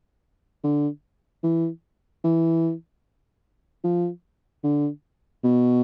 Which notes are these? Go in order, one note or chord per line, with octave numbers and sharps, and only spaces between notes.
D3
E3
E3
F3
D3
B2